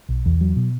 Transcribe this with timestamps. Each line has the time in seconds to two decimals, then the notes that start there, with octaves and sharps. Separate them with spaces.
0.09 B1
0.26 E2
0.41 F#3
0.56 B2